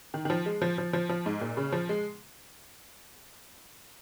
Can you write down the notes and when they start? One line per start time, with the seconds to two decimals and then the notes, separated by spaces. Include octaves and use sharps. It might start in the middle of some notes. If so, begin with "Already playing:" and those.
0.14 D#3
0.25 D#3
0.30 F3
0.46 G#3
0.62 F3
0.78 F3
0.93 F3
1.09 F3
1.26 G#2
1.41 A#2
1.57 C#3
1.72 F3
1.89 G#3